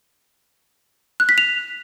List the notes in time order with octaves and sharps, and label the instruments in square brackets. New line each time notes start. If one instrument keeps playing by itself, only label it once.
[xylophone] F#6
B6
F7